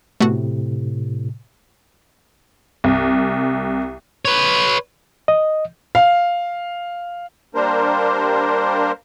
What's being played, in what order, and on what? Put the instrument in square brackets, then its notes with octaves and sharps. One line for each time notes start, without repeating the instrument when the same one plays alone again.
[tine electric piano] A2 C3 [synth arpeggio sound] A3 B3 F#4
[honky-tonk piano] C2
[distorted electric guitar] B4 C#5
[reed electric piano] D#5
[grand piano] F5
[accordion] G3 A#3 D4 A#4 C5